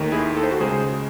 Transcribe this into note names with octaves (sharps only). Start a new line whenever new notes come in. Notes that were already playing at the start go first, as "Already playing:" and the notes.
Already playing: D#2 D#3 A3
E4 G#4
A4
C5
F#4 A4
C#2 C#3 G#3 G#4 C5